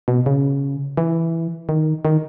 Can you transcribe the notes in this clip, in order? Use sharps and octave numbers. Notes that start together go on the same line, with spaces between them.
B2
C#3
E3
D#3
D#3